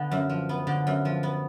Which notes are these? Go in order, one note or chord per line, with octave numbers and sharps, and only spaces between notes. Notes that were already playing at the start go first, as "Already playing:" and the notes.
Already playing: D3 B3
F#2
F3
B3
D3
F#2
F3
B3